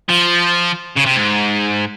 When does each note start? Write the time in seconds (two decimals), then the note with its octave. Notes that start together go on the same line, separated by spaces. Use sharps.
0.09 F3
0.96 C#3
1.06 C3
1.16 G#2